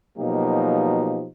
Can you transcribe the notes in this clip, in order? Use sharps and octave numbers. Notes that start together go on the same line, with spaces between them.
B2 F3 F#3 A#3 D#4 G4